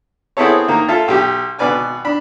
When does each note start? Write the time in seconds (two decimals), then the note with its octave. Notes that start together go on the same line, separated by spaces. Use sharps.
0.37 B3 C4 E4 G#4 A4 C#5
0.68 D#3 A#3
0.88 F4 A4 E5 A5
1.08 B1 G4
1.59 G#1 B2 B4 D5 G#5 F6
2.05 D4 B5